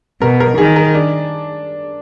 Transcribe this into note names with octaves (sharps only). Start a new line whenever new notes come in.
B2 A#4
A#4
D#3 G#4
A#4
D4